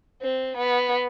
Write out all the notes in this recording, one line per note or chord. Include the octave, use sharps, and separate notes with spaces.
C4
B3